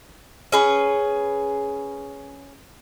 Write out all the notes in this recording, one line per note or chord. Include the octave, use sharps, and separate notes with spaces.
C#4 G#4 B4